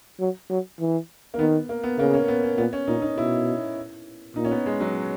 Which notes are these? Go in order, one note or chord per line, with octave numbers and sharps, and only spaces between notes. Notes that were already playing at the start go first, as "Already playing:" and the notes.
F#3
F#3
E3
A#3
D#3 B3
A#3
B3
C#3 A#3
C#4
B3
C#4
A#2 B3
C#4
A#2 D#4
D#4
B2 E4
A#2 D#4
C#4
B3
G#3
F#3